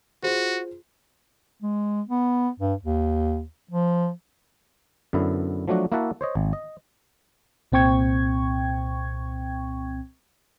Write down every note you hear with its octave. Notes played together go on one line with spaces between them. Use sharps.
F4 F#4 G#4 C5
G#3
B3
G2
D#2
F3
F#2 D3 B3 E4
F3 F#3 A3 D4 F#4
A#3 E4 F#4 E5 F#5 A5
C5 C#5 D#5
G#1
D#5
C2 A#2 C4 G5 C#6 G#6